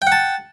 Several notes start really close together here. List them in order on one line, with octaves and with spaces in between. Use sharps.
G5 F#5 A5